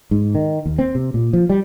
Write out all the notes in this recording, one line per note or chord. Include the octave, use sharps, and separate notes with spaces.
G#2
D#3
D#2
C4
C3
A#2
F3
G3